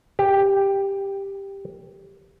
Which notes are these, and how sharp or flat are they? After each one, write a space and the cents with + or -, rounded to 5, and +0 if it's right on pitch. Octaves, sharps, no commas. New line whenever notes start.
G4 +5